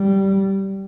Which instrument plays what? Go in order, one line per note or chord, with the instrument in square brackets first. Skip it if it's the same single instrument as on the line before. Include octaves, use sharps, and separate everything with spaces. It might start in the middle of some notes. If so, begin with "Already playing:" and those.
Already playing: [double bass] G3